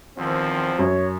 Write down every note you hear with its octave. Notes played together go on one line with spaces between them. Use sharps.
E2 D#3 F3 C4
F#2 C#5